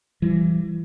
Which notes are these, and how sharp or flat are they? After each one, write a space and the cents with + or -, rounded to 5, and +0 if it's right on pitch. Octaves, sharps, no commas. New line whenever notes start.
E3 +30 G3 -10